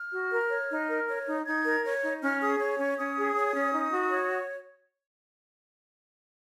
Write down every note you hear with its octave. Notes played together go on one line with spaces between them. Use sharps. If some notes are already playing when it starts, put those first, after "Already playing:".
Already playing: F6
F#4
A#4
C#5
D#4
A#4
C#5
D#4
D#4 G#6
A#4
C#5
D#4
C#4 F6
G#4 D#6
C#5 C#6
C#4 C#6
C#4 D#6
G#4
C#5
C#4
D#4
F#4
C#5